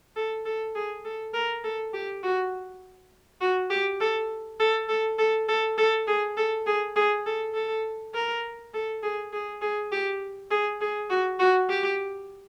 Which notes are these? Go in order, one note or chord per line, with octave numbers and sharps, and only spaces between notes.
A4
A4
G#4
A4
A#4
A4
G4
F#4
F#4
G4
A4
A4
A4
A4
A4
A4
G#4
A4
G#4
G#4
A4
A4
A#4
A4
G#4
G#4
G#4
G4
G#4
G#4
F#4
F#4
G4